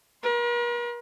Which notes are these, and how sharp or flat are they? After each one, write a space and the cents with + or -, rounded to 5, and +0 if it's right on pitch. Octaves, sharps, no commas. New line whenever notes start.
A#4 +45 C6 +0